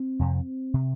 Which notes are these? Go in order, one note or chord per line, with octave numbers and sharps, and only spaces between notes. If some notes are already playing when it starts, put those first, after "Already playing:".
Already playing: C4
F2 C3
C3